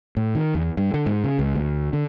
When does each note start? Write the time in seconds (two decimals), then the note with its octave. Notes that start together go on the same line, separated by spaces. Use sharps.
0.17 A2
0.35 D#3
0.55 E2
0.77 G2
0.94 D3
1.06 G#2
1.24 C#3
1.39 C#2
1.56 D2
1.93 D3